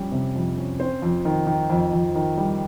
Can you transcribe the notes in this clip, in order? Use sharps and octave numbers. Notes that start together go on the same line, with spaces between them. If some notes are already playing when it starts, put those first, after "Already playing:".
Already playing: F2 G3 C#4
C3
F2
C#4
C4 C5
F2
D#3
D#3
F2
F2
D#3
G3